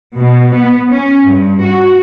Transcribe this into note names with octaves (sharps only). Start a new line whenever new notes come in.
B2
B3
C#4
G2
F#4